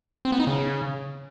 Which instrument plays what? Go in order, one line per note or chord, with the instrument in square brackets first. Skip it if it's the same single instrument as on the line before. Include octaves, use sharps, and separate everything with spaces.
[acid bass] C4
B3
D#4
C#3